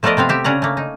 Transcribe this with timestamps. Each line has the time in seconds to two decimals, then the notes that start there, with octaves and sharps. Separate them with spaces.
0.03 F3 A3 B3 A#4 D5 D#5
0.17 C3 B3 C4 F5
0.29 C4 G4 E5
0.44 C#3 C#4 D4 F#5 A#5
0.62 A3 A#3
0.77 D#4